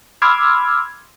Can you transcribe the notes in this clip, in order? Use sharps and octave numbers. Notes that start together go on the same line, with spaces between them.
B5 C6 D6 E6 F6 G#6